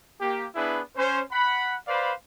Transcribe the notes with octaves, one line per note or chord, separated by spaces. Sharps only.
A#3 G4
B3 D4 E4 G#4 B4
C#4 C5
F#5 B5
B4 C5 D5 F5 B5